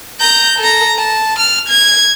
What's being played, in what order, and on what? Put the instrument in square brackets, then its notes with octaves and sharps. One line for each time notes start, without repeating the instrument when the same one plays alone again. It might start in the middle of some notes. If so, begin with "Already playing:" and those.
[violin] A#5 G6
A4 A#5
A5
F6
G#6